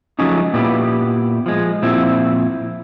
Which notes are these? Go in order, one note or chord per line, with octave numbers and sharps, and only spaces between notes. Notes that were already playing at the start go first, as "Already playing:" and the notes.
F3 F#3 G#3 A3 C#4 D#4
A#2 B3 E4 G4
F3 G#3
A#2 F3 C4 E4